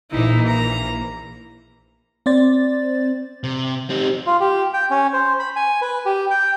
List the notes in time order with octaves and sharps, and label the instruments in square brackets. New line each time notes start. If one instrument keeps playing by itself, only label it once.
[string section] A#1 E3 A#3 [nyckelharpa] D#4 E4
[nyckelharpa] A#5
[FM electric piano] C4 C5 D5 A6
[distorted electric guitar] C3
[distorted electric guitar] C4 D#4 [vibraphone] G4
[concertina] F4
G4
G5
C#4
C5
B5
G#5
B4
G4
G5